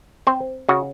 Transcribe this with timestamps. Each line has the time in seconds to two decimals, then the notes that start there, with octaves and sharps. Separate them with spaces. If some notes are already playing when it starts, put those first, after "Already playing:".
0.27 C4 C5
0.69 C#3 F#4